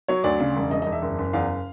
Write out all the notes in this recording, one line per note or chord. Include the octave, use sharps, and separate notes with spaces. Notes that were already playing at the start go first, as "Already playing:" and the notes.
F#3 C#5
D2 D5
C#3
E1
E1 D#5
E1 D#5
E5
F#1
F#1
E2 F5